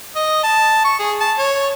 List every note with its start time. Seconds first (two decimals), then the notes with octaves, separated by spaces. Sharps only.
0.16 D#5
0.43 A5
0.85 C#6
0.99 G#4
1.20 A5
1.39 C#5